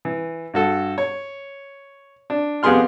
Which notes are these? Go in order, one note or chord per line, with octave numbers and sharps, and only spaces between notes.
E3
G2 F#4 A4
C#5
D4
F2 B3 G4 G#4 C6 F6